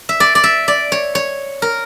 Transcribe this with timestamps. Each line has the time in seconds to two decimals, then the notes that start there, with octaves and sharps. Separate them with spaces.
0.09 E5
0.20 D5
0.35 D5
0.44 E5
0.68 D5
0.92 C#5
1.15 C#5
1.62 A#4